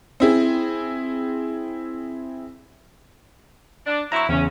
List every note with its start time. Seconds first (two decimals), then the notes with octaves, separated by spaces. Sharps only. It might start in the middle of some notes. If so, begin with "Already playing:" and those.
0.20 C4 E4 G#4
3.86 D4
4.12 F#3 C4 E4 A#5 C6 C#6
4.29 E2 C#3 C#4